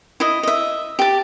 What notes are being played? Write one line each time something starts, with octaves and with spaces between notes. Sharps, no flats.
E4 D#5
D#5 E5
G4 A5